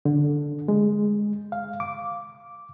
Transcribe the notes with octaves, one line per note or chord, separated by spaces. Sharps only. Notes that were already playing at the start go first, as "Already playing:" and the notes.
D3
G#3
F5
D6